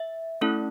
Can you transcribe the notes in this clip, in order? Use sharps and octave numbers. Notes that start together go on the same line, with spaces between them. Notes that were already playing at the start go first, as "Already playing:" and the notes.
Already playing: E5
A3 C#4 E4 A4